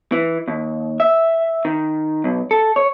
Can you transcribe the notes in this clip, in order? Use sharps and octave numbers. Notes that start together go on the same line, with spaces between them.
E3
D#2
E5
D#3
B1
A4
C#5